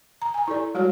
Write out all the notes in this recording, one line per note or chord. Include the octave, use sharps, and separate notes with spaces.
A#5
G#5 A#5
E4 G4 A4 D5
G3 G#3 F#4 G4 C#5